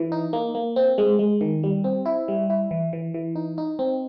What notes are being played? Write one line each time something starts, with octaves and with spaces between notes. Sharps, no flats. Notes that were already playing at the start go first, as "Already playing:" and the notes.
Already playing: E3
D#4
A#3
A#3
C4
G#3
G#3
D#3
G3
C4
E4
G3
E4
E3
E3
E3
D#4
D#4
C4